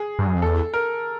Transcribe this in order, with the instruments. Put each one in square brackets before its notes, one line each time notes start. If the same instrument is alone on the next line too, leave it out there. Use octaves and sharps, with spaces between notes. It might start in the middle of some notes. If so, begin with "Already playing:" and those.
Already playing: [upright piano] G#4
[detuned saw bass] G2
F#2
F2
[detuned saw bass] E2 [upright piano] A4
[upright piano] A#4